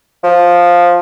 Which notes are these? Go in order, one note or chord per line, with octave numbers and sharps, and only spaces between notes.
F3